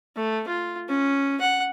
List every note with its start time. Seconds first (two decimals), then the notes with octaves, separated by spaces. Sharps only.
0.16 A3
0.48 F4
0.89 C#4
1.41 F#5